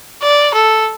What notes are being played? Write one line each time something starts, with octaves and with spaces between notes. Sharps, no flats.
D5
A4